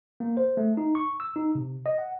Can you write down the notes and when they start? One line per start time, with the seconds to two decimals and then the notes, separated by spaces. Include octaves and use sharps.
0.20 A#3
0.37 C5
0.57 A3
0.77 D#4
0.95 C#6
1.20 E6
1.36 D#4
1.55 C3
1.86 D#5
1.98 F#5